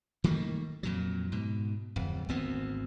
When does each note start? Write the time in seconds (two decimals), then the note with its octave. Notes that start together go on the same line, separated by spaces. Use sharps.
0.24 D#3 G3 A3 A#3
0.83 F2 A#2 F#3
1.32 G#2 B2
1.96 D1 F2
2.29 G#1 D2 B3 C4